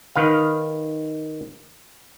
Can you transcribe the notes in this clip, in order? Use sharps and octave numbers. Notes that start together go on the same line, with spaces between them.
D#3 B4 F5